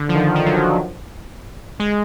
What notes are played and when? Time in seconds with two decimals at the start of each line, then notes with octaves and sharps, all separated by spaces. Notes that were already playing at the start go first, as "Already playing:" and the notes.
Already playing: D3
0.09 F3
0.15 D#3
0.35 F3
0.46 F#3
0.56 D#3
1.80 G#3